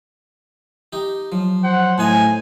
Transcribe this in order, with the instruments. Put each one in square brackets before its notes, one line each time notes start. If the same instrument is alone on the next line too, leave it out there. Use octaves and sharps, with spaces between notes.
[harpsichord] D#4 G4
[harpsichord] F3 [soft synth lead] F#3
[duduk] C5 [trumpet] F#5
[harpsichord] A2 D#4 A#5 [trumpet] G#5